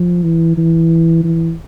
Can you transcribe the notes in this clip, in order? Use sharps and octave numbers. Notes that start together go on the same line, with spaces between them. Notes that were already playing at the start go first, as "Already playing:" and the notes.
Already playing: F3
E3
E3
E3